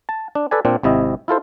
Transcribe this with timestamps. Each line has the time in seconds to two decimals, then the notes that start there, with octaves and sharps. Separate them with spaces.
0.09 A5
0.35 D4
0.51 A4 B4 D5 G#5
0.65 A#2 C4 D4
0.83 G#1 C3 E4 D#5
1.28 E4 F4 A4 C5